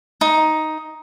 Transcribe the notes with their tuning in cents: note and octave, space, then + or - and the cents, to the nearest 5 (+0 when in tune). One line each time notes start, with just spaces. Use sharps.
D#4 +5